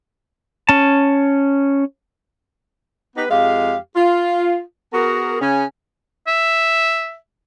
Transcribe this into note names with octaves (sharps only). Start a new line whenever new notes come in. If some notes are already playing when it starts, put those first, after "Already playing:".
C#4 A5
B3 D#4 G4 B4
F2 G#3 G4 F5
F4
B3 F#4 G#4 A#4
C#3 C#4
E5